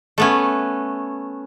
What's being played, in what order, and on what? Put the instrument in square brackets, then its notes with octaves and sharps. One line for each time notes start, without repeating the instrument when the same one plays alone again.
[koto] A3 B3 C#4